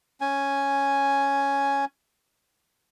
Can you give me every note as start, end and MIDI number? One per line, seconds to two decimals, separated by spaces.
0.21 1.85 61
0.21 1.85 80